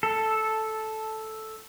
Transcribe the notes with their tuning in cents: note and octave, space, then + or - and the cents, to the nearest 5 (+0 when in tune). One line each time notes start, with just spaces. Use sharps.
A4 -5